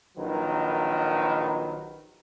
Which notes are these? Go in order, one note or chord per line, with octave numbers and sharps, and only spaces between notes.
A#1 D#3 F#3 B4